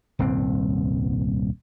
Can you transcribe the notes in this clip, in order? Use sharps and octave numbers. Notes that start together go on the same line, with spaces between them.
D#1 C2 G2 C4